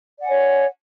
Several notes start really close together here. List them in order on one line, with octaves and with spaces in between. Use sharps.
D5 F#5 G#5 C#5